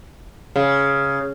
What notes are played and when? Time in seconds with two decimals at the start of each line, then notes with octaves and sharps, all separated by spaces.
0.56 C#3